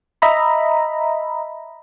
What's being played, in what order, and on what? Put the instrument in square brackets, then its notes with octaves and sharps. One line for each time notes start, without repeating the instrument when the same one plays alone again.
[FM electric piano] D#5 E5 A#5 B5